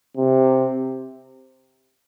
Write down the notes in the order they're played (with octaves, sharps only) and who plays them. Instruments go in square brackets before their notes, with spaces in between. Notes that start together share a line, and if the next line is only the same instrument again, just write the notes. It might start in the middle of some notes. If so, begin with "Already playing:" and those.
[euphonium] C3